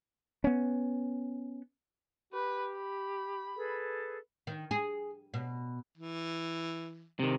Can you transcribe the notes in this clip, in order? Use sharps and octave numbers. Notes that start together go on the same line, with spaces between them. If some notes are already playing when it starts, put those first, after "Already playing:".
B3 C#4
G4 B4
B5
G#4 A4 B4
D#3
G#4
B2
E3
C3 D#3